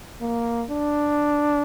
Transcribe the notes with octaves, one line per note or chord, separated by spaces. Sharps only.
A#3
D4